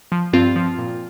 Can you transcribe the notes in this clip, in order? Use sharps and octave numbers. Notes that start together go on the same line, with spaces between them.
F3
G2 C4 F4
F3
A#2